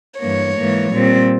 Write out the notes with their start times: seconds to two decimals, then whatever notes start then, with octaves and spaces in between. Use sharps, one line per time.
0.20 G2 E3 A#3 C#5
0.56 G#2 E3 A#3
0.92 A#2 G3 C4